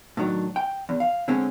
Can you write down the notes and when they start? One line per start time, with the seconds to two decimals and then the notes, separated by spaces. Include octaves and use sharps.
0.17 A2 D#3 F#3 D4
0.56 G5
0.89 E2
1.00 F5
1.28 D3 G#3 C4 C#4